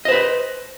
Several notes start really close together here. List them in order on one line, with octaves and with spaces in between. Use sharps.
D#5 C5 B4